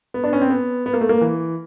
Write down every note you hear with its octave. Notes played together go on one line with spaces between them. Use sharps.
B3
D4
C#4
C4
B3
B3
A#3
A3
A#3
E3